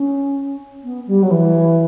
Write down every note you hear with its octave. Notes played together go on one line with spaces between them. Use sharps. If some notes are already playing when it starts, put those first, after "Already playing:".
Already playing: C#4
B3
G3
F#3
E3